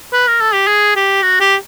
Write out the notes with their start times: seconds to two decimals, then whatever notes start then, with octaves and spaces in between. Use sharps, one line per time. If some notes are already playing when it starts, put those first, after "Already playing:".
0.13 B4
0.28 A#4
0.41 A4
0.54 G4
0.67 G#4
0.96 G4
1.23 F#4
1.40 G4